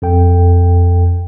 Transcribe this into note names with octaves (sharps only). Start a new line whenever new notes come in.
F2 A4 G5